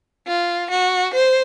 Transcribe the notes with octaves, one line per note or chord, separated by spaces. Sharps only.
F4
F#4
C5